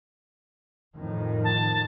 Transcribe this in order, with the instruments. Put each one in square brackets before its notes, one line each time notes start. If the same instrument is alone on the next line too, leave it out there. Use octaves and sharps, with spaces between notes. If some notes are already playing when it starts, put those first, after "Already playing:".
[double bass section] F2 A2 D#3
[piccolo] A5